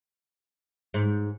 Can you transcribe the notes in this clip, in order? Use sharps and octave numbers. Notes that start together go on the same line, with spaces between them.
G#2